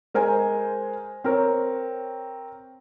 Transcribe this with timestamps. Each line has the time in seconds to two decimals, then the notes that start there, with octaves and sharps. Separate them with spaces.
0.14 G#3 A#4 C5 G#5
1.24 C4 A#4 C#5